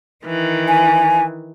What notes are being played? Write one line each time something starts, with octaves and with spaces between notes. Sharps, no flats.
D#3 E3
G#5